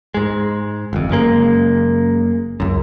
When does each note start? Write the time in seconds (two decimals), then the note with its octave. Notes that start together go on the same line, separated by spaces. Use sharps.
0.14 G#2 G#3
0.93 G1 F2
1.09 F#1 C#3 G#3 A#3
2.60 C#2 F#2